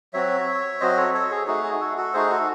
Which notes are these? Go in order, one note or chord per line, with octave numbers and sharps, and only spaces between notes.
F#3 C4 F#4 C#5 E5
F#3 C4 F#4 C5 D#5
A4 C#5
A4 C#5
G#4
A3 D#4 F#4 G#4
G#4
F#4 A4
F#4 A4
A3 D#4 F#4 G#4 C5
F#4 A4